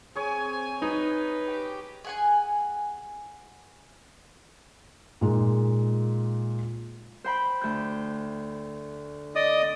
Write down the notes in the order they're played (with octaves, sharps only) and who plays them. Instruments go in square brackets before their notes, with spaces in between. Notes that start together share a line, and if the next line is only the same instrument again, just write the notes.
[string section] C4 G#5 [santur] G#4 C#5
[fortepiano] D#4 [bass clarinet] B4
[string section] G4
[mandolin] G#4 F#5 G#5
[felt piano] A#2 G#3 D#4
[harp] C5 G5 B5
D2 G6
[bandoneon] D5 D#5 D#6